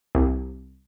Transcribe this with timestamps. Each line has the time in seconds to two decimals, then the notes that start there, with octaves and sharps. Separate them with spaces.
0.15 C2